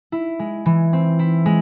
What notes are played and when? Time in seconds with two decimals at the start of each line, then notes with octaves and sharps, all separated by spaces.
0.12 E4
0.39 G#3
0.66 E3
0.93 C4
1.19 E4
1.46 G#3